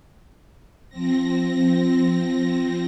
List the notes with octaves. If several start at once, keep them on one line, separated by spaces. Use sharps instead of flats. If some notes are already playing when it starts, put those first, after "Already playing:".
F3 C4 A#6